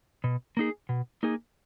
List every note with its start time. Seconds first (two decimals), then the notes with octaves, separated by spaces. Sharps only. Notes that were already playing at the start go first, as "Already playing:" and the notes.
0.24 B2
0.57 A#3 D#4 G#4
0.89 B2
1.23 A#3 D#4 G#4